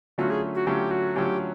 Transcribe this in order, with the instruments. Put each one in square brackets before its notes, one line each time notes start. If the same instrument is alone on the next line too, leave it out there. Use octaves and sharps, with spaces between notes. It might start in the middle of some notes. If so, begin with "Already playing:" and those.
[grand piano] D3 F#3 A3 C#4 F4 [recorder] F#4
[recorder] G#4
F#4
[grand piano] D3 F#3 A3 C#4 F4 [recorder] G4
[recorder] F#4
[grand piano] D3 F#3 A3 C#4 F4 [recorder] G4